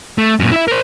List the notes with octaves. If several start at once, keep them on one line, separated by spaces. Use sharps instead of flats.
A3
F#2 A#2
E4 E5
A#4 C5